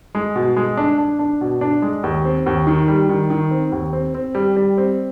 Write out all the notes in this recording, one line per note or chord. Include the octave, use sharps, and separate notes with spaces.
G#3
B2
G#3
D4
D4
D4
B2
D4
G#3
D#2
C4
D#2
D#3
G3
D#3
D#3
C4
D#2
C4
C4
G3
G3
C4